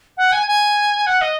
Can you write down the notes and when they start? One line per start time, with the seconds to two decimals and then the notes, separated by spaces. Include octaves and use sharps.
0.17 F#5
0.32 G#5
0.47 G#5
1.07 F#5
1.21 D#5